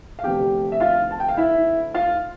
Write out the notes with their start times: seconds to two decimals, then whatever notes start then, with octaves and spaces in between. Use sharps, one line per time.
0.19 F5
0.24 D2 C3 F3 B3 D4 G4 G5
0.72 E5
0.80 F4 F5
1.11 A5
1.20 G5
1.29 F5
1.37 E4 E5
1.94 F4 F5